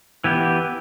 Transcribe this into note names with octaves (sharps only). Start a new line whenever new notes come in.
E3 B3 G4